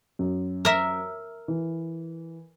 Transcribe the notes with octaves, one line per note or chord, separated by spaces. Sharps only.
F#2
A#4 E5
E3